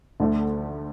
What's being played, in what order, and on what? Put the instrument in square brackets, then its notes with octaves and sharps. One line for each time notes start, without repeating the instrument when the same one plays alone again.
[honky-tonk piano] D2 D3 A3